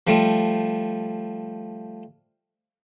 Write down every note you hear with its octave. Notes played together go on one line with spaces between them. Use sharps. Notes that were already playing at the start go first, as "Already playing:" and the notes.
F3 G3 A3 F4